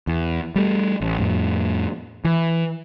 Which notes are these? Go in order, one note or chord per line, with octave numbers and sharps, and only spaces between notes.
E2
G3 A3
A1
F2 A2
E3